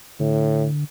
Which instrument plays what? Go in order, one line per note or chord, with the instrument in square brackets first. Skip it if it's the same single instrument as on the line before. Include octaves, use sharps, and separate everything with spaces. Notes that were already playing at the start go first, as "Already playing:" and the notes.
[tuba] A2 [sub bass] D3